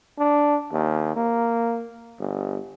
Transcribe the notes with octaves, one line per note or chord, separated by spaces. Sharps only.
D4
D#2
A#3
G1